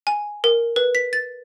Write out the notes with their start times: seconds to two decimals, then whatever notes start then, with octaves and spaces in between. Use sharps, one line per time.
0.07 G#5
0.44 A#4
0.76 B4
0.95 B6
1.13 A6